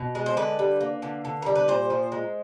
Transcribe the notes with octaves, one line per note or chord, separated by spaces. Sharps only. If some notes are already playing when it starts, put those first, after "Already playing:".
Already playing: B2
G#3
C5
D3 B4
G3
A#3
D3
D3
G3 A#4
B4
A#2 C5
F3
G#3